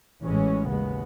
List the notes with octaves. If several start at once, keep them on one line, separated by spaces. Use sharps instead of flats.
A1 A2 E3 G#3 C#4
D#2 C#3 G#3 B3